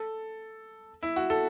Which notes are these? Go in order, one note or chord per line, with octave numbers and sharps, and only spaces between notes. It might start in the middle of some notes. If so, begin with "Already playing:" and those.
Already playing: A4
E4
F#4
A4